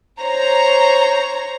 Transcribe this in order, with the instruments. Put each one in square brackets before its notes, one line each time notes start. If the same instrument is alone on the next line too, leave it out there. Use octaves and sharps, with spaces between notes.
[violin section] C5 C#5 A#5